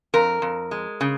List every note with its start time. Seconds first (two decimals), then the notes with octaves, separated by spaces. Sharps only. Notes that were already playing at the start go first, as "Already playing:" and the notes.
0.14 F2 A#4
0.42 F2
0.71 G#3
1.01 C#3